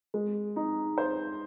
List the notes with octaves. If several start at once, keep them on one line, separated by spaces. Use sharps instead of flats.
G#3
D#4
C5